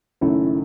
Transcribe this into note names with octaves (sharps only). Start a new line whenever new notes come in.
F#1 F#2 D#3 A3 C#4 E4